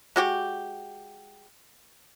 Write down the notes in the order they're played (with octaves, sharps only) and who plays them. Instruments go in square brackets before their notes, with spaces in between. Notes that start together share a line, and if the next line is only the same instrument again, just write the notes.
[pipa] G#3 F#4 G4